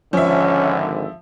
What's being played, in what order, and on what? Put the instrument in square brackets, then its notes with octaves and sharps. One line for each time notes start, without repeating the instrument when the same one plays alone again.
[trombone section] G#1 D3 [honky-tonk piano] F3 E5 [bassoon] C#4